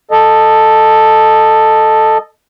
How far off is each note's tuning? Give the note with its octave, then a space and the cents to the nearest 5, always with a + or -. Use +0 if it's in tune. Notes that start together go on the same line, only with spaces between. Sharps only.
A4 +0 D#5 -10